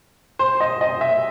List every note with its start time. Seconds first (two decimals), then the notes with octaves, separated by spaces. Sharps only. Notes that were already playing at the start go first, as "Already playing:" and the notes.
0.39 C5
0.60 D#5
0.81 D#5
1.01 E5